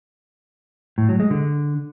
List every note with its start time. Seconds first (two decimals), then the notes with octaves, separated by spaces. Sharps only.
0.98 A2
1.09 F#3
1.20 G#3
1.31 D3